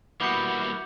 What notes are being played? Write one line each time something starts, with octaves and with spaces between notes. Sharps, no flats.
G3 A#3 B3 E4 F#4 D6 G6 C#7